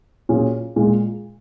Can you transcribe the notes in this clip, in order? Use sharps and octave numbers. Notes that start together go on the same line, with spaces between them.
A#2 F#3 C#4 G#4
A#2 G#3